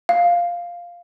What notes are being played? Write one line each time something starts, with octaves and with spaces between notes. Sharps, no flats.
F5